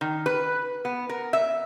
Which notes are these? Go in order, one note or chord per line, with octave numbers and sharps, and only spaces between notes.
D#3
B4
B3
A#4
E5